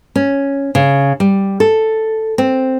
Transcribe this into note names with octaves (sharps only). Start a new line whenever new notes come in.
C#4
C#3
G3
A4
C4